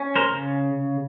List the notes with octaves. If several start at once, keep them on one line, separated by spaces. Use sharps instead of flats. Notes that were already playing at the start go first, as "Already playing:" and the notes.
Already playing: C#4
A#4 C5
C#3